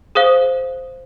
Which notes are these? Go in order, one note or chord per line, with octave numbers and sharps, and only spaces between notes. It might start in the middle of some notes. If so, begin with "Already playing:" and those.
G#4 C5 F5 D#6